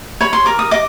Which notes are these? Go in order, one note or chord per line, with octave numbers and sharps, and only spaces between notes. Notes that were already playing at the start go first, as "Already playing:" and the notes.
C#5 B5
C6
A#4 D6
D#6
D#5 D6